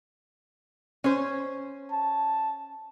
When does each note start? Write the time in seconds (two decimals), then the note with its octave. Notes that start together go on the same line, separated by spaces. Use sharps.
1.04 C#4 C5
1.92 A5